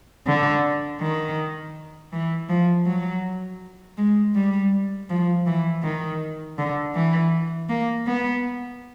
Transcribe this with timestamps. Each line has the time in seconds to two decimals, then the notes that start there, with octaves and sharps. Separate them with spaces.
0.27 D3
1.00 D#3
2.12 E3
2.49 F3
2.86 F#3
3.98 G#3
4.35 G3
5.09 F3
5.46 E3
5.84 D#3
6.58 D3
6.95 E3
7.69 A#3
8.07 B3